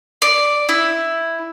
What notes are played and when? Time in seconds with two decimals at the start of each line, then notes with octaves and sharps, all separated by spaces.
0.22 D5
0.69 E4